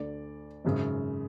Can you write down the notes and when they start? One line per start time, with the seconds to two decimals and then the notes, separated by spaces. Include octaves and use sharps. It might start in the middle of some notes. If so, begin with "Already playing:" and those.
Already playing: D2 D3 D5
0.65 G#1 F#2 C#3